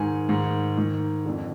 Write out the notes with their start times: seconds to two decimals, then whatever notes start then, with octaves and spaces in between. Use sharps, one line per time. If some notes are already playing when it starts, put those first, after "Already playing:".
Already playing: G#2 D#3 G#5
0.29 G#2 D#3
0.77 G#2 D#3
1.26 F2 D3